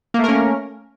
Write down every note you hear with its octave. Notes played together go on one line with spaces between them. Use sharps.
A3 A#3 C#4 A#4